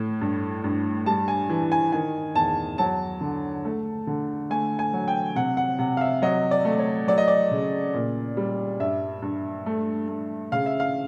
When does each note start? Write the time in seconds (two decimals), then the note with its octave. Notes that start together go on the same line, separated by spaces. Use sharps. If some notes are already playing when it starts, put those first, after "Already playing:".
Already playing: A2
0.21 G2
0.64 G2
1.06 G3 A5
1.28 G#5
1.49 E3
1.72 G#5
1.92 D#3 G#5
2.35 E2 A5
2.78 F#3 A5
3.21 D3
3.65 A3
4.07 D3
4.50 A3 G#5
4.79 G#5
4.93 F#3
5.08 G5
5.36 C3 F#5
5.57 F#5
5.79 C3 F#5
5.97 F5
6.01 E5
6.22 F#3 D#5
6.51 D5
6.65 A3
6.79 C#5
7.08 F#3 D5
7.18 D#5
7.28 D5
7.51 C#3
7.94 A#2
8.37 G3
8.80 G2 E5
9.22 G2
9.66 A3
10.08 A3
10.52 C#3 F5
10.66 E5
10.80 F5